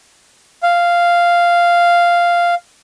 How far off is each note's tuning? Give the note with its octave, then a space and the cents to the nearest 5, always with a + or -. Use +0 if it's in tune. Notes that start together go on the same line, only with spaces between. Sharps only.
F5 -5